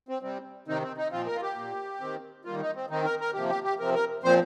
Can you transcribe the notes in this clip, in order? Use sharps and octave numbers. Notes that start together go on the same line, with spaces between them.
C4
C3 G3 C4
C3 D#3 C4 D#4
C4
D#4
A#2 F3 C4 F4
A#4
F4
G4
A#2 A#3
D#3 C4
D#3 G3 A#3 F4
D#4
C4
D#3 C4 D#4
A#4
A#4
C3 F3 A#3 G4
G4
G4
C3 F3 C4 A#4
A#4
A#2 F3 C4 C5